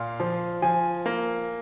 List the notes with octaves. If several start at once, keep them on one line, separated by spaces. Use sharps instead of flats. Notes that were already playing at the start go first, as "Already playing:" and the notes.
Already playing: A#2 F5
F3
F3 G#5
A#3